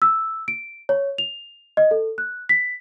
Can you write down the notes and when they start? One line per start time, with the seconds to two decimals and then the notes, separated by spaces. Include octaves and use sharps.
0.02 E6
0.48 D7
0.89 C#5
1.18 F7
1.77 D#5
1.91 A4
2.18 F#6
2.49 B6